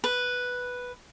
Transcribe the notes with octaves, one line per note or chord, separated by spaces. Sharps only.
B4